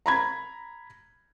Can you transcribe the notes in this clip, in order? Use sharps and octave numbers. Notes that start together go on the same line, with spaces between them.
A#5 B5 G#6